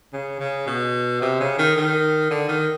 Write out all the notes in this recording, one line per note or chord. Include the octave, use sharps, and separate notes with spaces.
C#3
C#3
B2
C3
C#3
D#3
D#3
D3
D#3